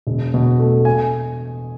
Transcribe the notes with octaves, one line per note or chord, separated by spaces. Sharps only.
E1
B2
A3
G#5